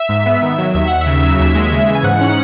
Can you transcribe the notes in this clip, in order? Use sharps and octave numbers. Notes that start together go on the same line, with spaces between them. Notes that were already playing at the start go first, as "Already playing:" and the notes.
Already playing: E5
G#2
B3
D#3
F#3
D#2 E5
D#2 F#5
E5
C#3
F#3
D#2
G#3
C#3
E3
G#5
G#2 F#5
C#4